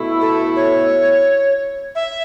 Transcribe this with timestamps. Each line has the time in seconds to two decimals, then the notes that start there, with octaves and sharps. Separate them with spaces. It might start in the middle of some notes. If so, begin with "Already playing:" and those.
Already playing: B2 A3 E4
0.21 A4
0.56 C#5
1.95 E5